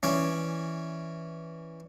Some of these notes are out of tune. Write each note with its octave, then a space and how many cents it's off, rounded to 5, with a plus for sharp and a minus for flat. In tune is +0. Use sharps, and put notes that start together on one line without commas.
E3 +0 C#4 +0 D5 +0